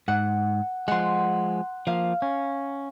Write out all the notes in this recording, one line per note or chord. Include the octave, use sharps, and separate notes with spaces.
G#2 F#5
F3 G#3 F#5 C6
F3 A#3 F5
C#4